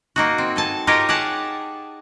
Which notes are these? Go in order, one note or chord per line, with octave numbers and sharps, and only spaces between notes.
A#3 D#4 F#4
C4
A4 G#5 A5
D#4 F4 G4 A#4 C#5 D#5
G4 G#4 C#5 F#5 G#5 A5